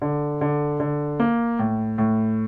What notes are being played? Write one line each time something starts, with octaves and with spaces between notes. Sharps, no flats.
D3
D3
D3
A#3
A2
A2